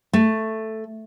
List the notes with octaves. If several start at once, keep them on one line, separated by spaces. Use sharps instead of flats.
A3